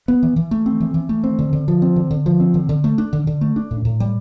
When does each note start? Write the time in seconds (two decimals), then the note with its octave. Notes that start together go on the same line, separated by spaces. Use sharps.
0.08 B3
0.23 E3
0.36 E3
0.51 A3
0.66 C4
0.80 E3
0.94 E3
1.09 A3
1.24 C4
1.39 D3
1.53 D3
1.68 F3
1.82 C4
1.96 D3
2.11 D3
2.26 F3
2.40 C4
2.54 D3
2.69 D3
2.84 A3
2.98 D4
3.13 D3
3.27 D3
3.41 A3
3.56 D4
3.71 A2
3.85 A2
4.00 G3